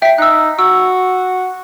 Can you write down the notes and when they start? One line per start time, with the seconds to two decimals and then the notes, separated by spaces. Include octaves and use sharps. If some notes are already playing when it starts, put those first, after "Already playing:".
0.02 E5 G5 B6
0.18 D#4 E6 F#6
0.59 F#4 E6